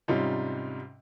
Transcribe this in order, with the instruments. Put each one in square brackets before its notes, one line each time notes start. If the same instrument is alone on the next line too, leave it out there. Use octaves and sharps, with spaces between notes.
[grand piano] G#2 C3 G3 C#4 D#4 F4